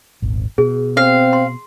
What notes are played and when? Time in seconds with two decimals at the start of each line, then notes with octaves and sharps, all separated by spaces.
0.22 D#1 G#1
0.58 B2 G#4
0.97 C4 F5
1.33 C6